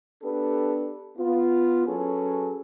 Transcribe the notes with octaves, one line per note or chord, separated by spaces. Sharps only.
B3 D4 G4 A4 B4
B3 F4
F#3 C#4 G#4 A4 B4